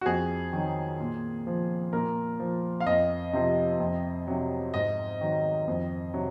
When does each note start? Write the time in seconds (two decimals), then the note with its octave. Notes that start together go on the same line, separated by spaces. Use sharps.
0.01 F#4
0.06 F2 G#4
0.53 D#3 F#3
1.00 A#2
1.47 F3
1.93 A#2 A#4
2.40 F3
2.80 F5
2.86 F2 D#5
3.33 C3 F3
3.80 F2
4.27 C3 F#3
4.74 G#2 D#5
5.21 D#3 F#3
5.68 F2
6.14 C3 F#3